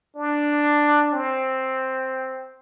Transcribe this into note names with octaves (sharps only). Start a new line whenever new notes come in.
D4
C4